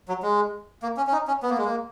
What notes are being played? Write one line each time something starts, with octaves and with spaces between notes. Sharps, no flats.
F#3
G#3
A#3
C#4
C#4
D#4
C#4
B3
A#3
G#3
A#3